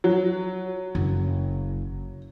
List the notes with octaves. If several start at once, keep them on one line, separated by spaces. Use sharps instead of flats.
F#3
F#1